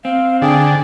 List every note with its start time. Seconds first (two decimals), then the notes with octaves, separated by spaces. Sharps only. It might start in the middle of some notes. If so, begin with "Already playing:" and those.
0.05 C4 F5
0.42 D3 G#4 G5